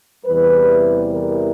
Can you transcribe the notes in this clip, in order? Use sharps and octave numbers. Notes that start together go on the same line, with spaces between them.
E2 C3 E3 G3 B4
A#4